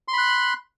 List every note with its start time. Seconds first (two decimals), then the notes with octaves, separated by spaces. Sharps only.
0.08 C6
0.13 B5
0.18 F#6